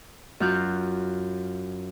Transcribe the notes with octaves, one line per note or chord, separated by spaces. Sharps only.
F#2 F#3 F4 F5 F#6 G6